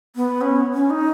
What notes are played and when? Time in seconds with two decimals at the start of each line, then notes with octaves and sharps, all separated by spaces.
0.16 B3
0.41 C#4
0.74 C#4
0.90 D#4